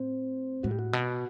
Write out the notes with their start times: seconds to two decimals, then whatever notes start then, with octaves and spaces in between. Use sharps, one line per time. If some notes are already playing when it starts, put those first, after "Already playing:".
Already playing: A2 C4
0.63 A2 F#4
0.71 G4
0.79 F#4
0.93 B2